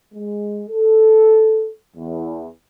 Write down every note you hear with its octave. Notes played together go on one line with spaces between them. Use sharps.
G#3
A4
E2